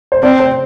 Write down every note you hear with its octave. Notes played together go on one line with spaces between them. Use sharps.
C5
C4 D5
C5